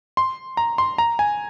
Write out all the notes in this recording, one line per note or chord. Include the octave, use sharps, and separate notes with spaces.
C6
A#5
C6
A#5
G#5